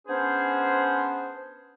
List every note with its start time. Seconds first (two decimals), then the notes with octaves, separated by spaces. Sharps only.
0.07 B3 C#4 D4 G#4 C5